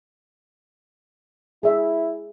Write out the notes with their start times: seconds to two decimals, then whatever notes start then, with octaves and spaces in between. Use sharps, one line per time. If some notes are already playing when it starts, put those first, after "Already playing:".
1.63 E4 G#4 E5